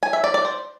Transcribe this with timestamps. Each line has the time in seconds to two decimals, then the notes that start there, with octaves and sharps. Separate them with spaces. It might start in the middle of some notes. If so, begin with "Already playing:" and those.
0.03 G#5
0.13 E5
0.24 D5
0.34 D5
0.45 C5